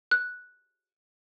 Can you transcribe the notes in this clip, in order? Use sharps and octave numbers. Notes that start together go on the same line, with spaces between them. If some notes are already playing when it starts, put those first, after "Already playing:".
F#6